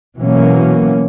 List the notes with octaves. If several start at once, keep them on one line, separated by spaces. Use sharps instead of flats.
B2 E3 F#3 A#3 C#4